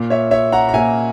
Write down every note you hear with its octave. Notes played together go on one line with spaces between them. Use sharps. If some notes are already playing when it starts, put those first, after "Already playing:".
Already playing: A#2 A#3
C#5 E5
C#5 E5
F#5 A#5
A#5
A#2 A#3 E5 G#5